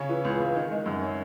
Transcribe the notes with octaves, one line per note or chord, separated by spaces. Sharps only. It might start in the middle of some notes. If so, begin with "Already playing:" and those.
Already playing: C#3 C#4
E3
C#2
C#2
D#3
G#3
F#2
C#4